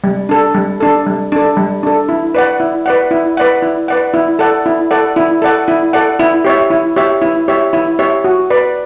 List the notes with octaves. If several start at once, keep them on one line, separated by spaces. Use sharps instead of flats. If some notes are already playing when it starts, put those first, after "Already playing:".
G3
D4 A4
G3
D4 A4
G3
D4 A4
G3
D4 A4
E4
B4 D5 F#5
E4
B4 D5 F#5
E4
B4 D5 F#5
E4
B4 D5 F#5
E4
A4 D5 F#5
E4
A4 D5 F#5
E4
A4 D5 F#5
E4
A4 D5 F#5
E4
G4 C#5 E5
E4
G4 C#5 E5
E4
G4 C#5 E5
E4
G4 C#5 E5
F#4
B4 D5